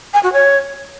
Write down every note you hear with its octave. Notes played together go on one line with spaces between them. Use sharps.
G#5
F#4
C#5